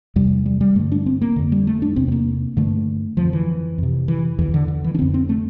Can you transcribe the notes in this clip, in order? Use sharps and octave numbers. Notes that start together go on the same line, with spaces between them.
E2 C3 G3
G3
G3
G2 D3 A3
D4
C4
A#3
F2 D3
G3
A3
D4
E2 C3 C4
C4
A#3
G2 D3 A3
F2 D3 F3
E3
F2 C3
E3
E2 D3 E3
D3
D3
E3
D4
F2 D3 C4
C4
A3